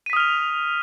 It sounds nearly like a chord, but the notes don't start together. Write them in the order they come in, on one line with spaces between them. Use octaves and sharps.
D#7 B6 D#6 F6 F7